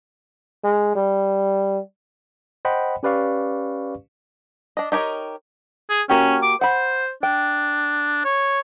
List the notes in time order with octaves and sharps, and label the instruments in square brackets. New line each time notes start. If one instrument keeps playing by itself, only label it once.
[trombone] G#3
G3
[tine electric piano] C5 D#5 F#5 G5 B5
C#4 G4 B4 D5 F5 C#6
[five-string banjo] D4 D#5
D#4 G4 A#4 C#5 D#5
[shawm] G#4
[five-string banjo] A#3 F#4 G4 [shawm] C#4
[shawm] D6
[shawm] C5 [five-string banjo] F#5 B5
[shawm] D4 [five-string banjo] G5
[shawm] C#5